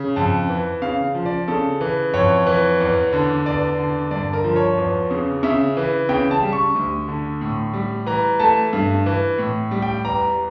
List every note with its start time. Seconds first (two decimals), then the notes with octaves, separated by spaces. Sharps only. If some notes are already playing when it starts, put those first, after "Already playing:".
Already playing: C#3
0.16 F2 A5
0.49 E3
0.82 C#3 F5
1.15 F3
1.26 D5
1.48 C#3 A4
1.81 E3
2.14 F2 C#5
2.46 E3
2.80 E2
3.13 D3
3.46 E2 D5
3.79 D3
4.11 G2 D5
4.33 A#4
4.44 F3
4.56 C#5
4.77 E2
5.11 C#3
5.43 C#3 E5
5.77 E3
6.09 C#3 G5
6.31 A5
6.42 G3
6.53 C#6
6.75 D2
7.08 D3
7.41 A2
7.74 G3
8.06 E3 A#5
8.40 A3 A5
8.73 G2
9.06 E3
9.38 A2
9.71 G3
9.82 G5
10.04 E2 A#5